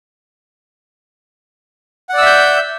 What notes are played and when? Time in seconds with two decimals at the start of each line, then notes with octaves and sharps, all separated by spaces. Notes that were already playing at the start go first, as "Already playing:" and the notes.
2.09 F#5
2.13 D5
2.18 E6
2.22 E5
2.26 G6